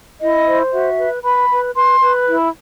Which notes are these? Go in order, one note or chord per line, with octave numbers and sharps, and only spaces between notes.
E4 D#5
C5
F#4 E5
B4
B4 B5
B4
B4 C6
B4
E4